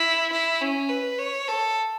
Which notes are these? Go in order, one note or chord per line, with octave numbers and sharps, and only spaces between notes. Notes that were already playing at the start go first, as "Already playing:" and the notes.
Already playing: E4
E4
C#4
B4
C#5
A4